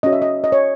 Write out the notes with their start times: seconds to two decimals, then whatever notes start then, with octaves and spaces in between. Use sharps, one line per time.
0.03 C#4 F#4 C#5 D#5
0.12 E5
0.22 D#5
0.44 D#5
0.52 C#5